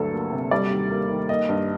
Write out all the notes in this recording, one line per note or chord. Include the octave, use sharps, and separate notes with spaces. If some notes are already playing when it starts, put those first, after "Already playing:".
Already playing: D2 G2 F#3 A4
A#3
C3
G3 D5
D#2
A#3
D#3
A#3 D#5
G2